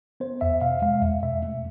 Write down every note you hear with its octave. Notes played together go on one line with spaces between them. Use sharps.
B3 C5
E2 E5
B2 F5
G#3 F5
E2 E5
B2 E5
A3